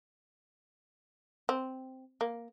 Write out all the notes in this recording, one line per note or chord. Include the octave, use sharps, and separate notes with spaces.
C4
A#3